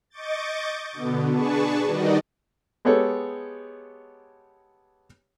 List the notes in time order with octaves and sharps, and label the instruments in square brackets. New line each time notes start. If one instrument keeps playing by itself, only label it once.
[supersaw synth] D#5 C#6 D6 G6 A6
B2 D3 B3
D4 G#4 B4 A5 C#6
D#3 G3 D#4 F#4 D5 D#5
[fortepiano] G#3 B3 G4 A4 C#5